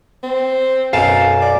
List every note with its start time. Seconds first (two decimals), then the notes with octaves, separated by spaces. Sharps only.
0.23 C4
0.93 B1 F#2 F5 A5
1.42 D5